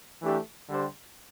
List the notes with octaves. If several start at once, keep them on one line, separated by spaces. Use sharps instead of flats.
E3 A3 D4 G4
D3 G3 D4 G4 C5